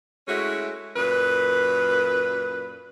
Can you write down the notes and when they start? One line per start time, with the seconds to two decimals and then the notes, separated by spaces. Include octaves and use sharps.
0.28 G#3 A3 C#4 E4 F#4
0.97 F#2 A#2 B4